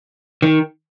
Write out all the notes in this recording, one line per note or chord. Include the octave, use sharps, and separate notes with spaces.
D#3